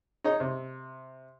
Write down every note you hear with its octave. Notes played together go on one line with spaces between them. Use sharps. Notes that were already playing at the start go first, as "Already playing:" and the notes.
D#4 G#4 C#5 D#5
C3